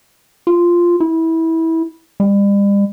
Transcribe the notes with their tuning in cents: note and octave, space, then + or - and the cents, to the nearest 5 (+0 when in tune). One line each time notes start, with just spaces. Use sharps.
F4 -5
E4 -20
G3 +40